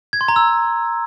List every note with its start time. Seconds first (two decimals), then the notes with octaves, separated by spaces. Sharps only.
0.13 G#6
0.21 C6
0.28 A#5
0.36 E6